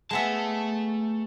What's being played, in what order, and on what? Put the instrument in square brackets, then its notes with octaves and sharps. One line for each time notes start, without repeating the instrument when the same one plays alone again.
[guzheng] G#3 B3 E5 [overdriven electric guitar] A3 A5